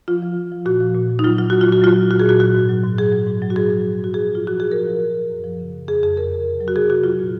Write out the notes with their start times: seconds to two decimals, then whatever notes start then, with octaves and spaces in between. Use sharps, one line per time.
0.08 F3 F4
0.22 F3
0.37 F3
0.52 F3
0.65 A#2 F#4
0.80 F3
0.95 A#2
1.09 F3
1.19 D#4
1.24 F#3 F4
1.38 F#3 F4
1.50 F#3 F#4
1.61 F4
1.67 A#2
1.72 F#4
1.82 F#3 F4
1.96 F#3
2.11 A#2 F#4
2.20 G#4
2.26 A#2 F#4
2.40 F#3 F#4
2.55 G#2
2.69 F#3
2.84 G#2
2.98 F#3 G#4
3.12 F#3
3.27 G#2
3.42 F#3
3.50 F#4
3.56 G#2 G#4
3.70 F3
3.85 G#2
3.99 G#2 F#4
4.14 F3 G#4
4.29 G#2
4.35 F4
4.43 F3 F#4
4.57 F3 G#4
4.72 F3 A#4
4.86 F3
5.01 F3
5.16 F3
5.30 F#2
5.44 F3
5.59 C#3
5.73 F3
5.88 F2 G#4
6.03 F2 G#4
6.17 F2 A#4
6.32 C3
6.46 F2
6.60 F#3
6.68 F#4
6.75 C3 G#4
6.90 F#3 F#4
7.04 F#3 F4
7.19 A#2